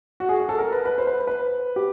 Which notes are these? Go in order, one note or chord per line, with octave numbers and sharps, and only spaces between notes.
F#4
G#4
G#4
A4
A#4
B4
B4
C5
B4
C5
B4
G4